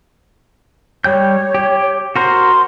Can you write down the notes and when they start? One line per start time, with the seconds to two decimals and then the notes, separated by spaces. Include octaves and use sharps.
1.04 G3 C#5 G5 G6
1.54 G4
2.16 F#4 A#4 C5 C6